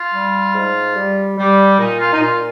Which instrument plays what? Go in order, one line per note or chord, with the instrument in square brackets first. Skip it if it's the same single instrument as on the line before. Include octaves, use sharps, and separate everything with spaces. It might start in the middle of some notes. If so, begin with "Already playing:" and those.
Already playing: [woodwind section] F4
G3
G#2
G3
G3
A#2 D#4
F4
D#4
A#2 F4